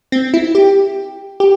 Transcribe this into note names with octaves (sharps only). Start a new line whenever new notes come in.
C4
E4
G4
G4